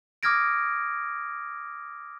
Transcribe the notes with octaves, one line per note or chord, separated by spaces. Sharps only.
D6 D#6 F6 G#6 A#6 D7